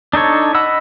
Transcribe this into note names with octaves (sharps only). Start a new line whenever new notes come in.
D4 D#4 A4 C#5
D#5 F#5 B5 E6